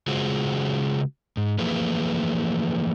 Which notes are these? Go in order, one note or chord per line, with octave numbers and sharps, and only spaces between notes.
C#3 G#3 F4 F#4 G#4 C5
G#2
E3 F3 A3 A#3 G#4 B4